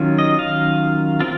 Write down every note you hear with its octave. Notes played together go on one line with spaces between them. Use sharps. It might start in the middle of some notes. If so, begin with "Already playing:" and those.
Already playing: D#3 F#3 C#4 F4
D#5
F5
C4 F4